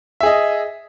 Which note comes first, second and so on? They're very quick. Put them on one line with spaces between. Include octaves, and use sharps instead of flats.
E5 G#4 D#5